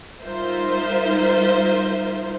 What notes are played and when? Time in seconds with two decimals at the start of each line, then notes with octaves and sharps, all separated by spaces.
0.23 G3 D#4 F4 A#4 C5 E5